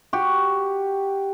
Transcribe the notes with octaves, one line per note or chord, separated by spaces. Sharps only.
F#4 G4